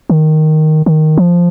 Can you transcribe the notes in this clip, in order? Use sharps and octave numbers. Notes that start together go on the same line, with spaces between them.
D#3
D#3
F3